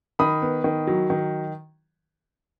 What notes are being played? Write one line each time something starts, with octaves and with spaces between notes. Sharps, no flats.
D#3 B5 D#6
B3
D#3
F#3
D#3